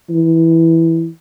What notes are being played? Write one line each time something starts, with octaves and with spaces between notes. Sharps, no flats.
E3